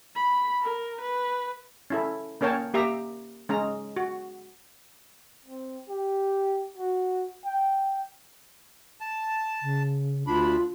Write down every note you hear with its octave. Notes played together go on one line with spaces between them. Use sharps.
B5
A#4
B4
C#4 E4 A4
A#3 C#4 A#4 C#5 G5 A5
A#3 G4 E5 A#5
G#3 C#4 A#5
F#4
C4
G4
F#4
G5
A5
C#3
D2 D4 F4 B5